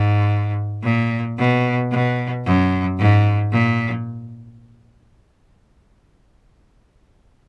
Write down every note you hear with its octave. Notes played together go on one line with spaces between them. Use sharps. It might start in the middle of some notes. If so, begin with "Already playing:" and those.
Already playing: G#2
A#2
B2
B2
F#2
G#2
A#2